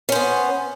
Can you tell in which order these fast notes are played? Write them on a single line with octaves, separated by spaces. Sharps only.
C#4 C5 B3